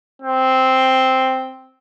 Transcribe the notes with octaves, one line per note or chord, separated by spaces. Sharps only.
C4